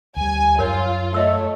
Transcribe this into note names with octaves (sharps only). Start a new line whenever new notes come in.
D2 G3 G#5
F#2 F4 A#4 C#5
A3 C#5 D#5 E5 E6